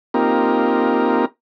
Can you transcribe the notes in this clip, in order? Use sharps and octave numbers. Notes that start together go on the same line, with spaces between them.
A#3 C4 D#4 F4 G4 A#4